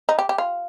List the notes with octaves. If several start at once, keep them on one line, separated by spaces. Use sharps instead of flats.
D#4
G4
G4
F4